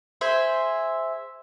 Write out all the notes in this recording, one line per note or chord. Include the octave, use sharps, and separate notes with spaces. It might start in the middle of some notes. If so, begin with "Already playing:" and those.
G#4 C5 E5